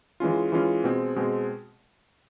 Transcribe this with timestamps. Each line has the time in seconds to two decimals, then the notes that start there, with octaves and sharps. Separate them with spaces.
0.20 E3 G#3 C#4 F4
0.52 E3 G#3 C#4 F4
0.84 B2 G#3 C4
1.16 B2 G#3 C4